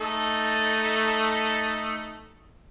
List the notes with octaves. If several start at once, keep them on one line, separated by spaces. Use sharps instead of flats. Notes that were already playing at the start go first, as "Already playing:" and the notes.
A3 D#4 A4